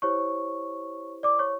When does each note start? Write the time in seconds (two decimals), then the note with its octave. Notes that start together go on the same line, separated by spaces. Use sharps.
0.02 E4 G4 C5 C#5 C#6
1.23 D5 D6
1.39 C#5 C#6